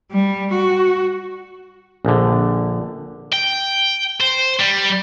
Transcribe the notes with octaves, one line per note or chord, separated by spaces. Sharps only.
G3
F#4
A#1 D3
G5
C5
G3